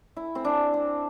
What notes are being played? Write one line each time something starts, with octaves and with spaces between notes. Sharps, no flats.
E4
C4
D4
C4